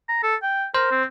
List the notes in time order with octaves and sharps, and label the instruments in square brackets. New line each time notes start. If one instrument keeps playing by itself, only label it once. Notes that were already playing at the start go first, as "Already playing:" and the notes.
[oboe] A#5
A4
G5
[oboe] A#4 [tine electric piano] C5
[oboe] C4